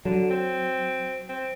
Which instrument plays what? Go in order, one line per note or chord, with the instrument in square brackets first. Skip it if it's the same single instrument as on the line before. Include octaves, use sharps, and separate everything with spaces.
[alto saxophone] D3 [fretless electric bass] F#3
[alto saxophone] C4
C4